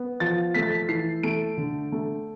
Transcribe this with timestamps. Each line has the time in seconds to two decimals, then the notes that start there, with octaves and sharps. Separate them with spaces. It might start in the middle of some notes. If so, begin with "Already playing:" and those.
Already playing: B3
0.20 F3 A6
0.54 A3 B6
0.63 A6
0.71 B6
0.89 E3 C7
1.23 A3 D7
1.57 D3
1.92 A3